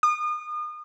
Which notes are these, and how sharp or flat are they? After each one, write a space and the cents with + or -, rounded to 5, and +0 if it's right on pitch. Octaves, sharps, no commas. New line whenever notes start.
D#6 -35